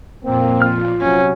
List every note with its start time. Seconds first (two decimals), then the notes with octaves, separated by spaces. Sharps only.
0.23 F2 A#2 A#3 C4
0.62 F4 F6
1.01 C3 F#3 C#4